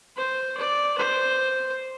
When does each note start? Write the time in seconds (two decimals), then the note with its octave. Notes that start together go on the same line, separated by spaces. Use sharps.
0.17 C5
0.57 D5
0.98 C5